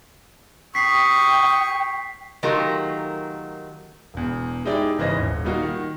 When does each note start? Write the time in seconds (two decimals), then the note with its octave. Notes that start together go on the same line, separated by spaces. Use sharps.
0.75 G5 C#6 D#6 B6 C7
2.43 D#3 F#3 A3 F4 G4 A#4
4.14 E1 E2
4.65 G#3 D#4 E4 G4 D5
4.98 G#1 C#3 E3 C5 D#5 A#6
5.18 D#1
5.45 G3 A#3 D#4 F4 F#4
5.62 D#3